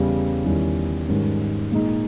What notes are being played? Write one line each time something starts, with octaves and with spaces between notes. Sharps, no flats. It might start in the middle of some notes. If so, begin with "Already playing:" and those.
Already playing: E2 C#3 G3
E2 D#3 G3 C#4 E4
G#2 D#3 G3 C#4
A#2 G#3 D#4